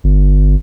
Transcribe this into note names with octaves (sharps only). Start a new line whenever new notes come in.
G1